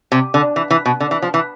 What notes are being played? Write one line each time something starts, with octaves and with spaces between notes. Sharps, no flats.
C3
D3
E3
E3
B2
D3
E3
F3
E3